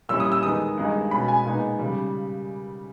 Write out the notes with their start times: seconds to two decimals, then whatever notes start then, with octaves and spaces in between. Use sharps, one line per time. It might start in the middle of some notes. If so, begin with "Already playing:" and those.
0.09 A#2 G3 C#4 E4 E6
0.20 D#6
0.32 E6
0.43 E2 D#3 G#3 B3 D#4 D#6
0.77 G2 D#3 G#3 D#4
1.11 B2 G#3 C#4 B5
1.28 G#5
1.46 A#2 G#3 B3 D#4
1.79 C#3 G3